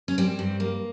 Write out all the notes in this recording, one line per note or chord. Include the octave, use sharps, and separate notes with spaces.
C#4
G3 C4
G2
A#3